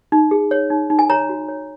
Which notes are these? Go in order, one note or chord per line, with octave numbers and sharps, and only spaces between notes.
D#4
G#4
C#5
D#4
D#4
G#5
C#5 A#5
F#4
C#5